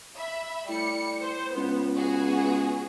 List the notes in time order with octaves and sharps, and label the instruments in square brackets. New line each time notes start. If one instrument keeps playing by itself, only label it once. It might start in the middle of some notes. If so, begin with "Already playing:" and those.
[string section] E5 B5
[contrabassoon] A2 [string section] G3 C#7
[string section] C5
[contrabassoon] C#2 [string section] B3
[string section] B3 F#4 G#4